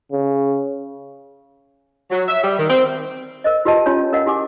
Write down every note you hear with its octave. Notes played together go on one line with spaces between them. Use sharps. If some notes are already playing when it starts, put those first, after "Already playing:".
C#3
F#3
E5
G3
D#3
C4
A#4 C5 D#5
F4 G4 B4 D#5 A5
C#4 F4 G4 C#5 G#5
C#4 A#4 D#5 F5 F#5
E4 G4 G#5 D6